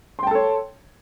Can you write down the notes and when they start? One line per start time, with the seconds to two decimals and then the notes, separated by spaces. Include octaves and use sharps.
0.19 C6
0.23 G5
0.27 A5
0.31 A4
0.35 C#5